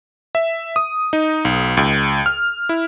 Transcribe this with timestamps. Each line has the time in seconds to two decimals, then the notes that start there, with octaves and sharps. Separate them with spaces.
0.35 E5
0.76 D#6
1.13 D#4
1.45 B1
1.77 C#2
2.26 F6
2.69 E4